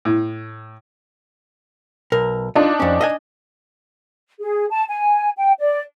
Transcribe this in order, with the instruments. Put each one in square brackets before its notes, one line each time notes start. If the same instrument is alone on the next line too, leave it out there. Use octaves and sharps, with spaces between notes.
[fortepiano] A2
[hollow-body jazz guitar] B1 A#4
[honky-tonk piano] D4 D#4 [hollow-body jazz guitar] F4
[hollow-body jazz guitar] F2 C#4
D#5 E5 G#5
[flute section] G#4
A5
G#5
G5
D5